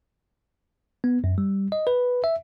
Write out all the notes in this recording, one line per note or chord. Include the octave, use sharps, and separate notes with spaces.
B3
F#2
G3
D#5
B4
E5